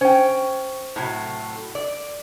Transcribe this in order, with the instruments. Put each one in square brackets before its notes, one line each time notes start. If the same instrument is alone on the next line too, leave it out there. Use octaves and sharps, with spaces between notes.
[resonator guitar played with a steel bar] C#4 G5 [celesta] C5
[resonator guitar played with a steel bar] A2 C3 F#3
D5